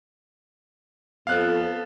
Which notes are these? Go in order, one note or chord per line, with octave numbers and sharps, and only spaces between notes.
F2 B3 A4 F5 F#6